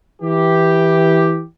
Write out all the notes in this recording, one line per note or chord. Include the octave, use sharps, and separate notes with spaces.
E3 G4